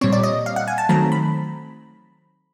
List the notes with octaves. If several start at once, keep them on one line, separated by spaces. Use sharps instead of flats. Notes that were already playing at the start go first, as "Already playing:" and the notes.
A#2 G3 C4 C#5
D5
D#5
F5
F#5
G#5
A5
D#3 F#3 A3 C4 A#5
B5